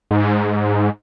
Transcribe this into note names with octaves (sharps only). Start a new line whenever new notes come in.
G#2